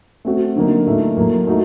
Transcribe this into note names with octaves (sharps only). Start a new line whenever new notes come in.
A3 C4 F#4
D3 F#3 A#3 D#4
A2 A3 D#4
A2 F#3 A#3
A3 D#4 F#4